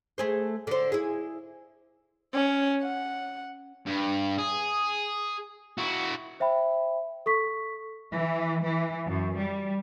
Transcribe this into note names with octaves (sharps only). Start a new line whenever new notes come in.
A3 G#4 C5
D3 C5
E4 G#4
C#4
F#5
G2
G#4
E4 F#4
C5 E5 G5 B5
A4 C#6 B6
E3
E3
F#2
G3